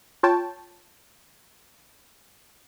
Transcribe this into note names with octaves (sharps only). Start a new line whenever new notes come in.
F4 C#5 G5 A5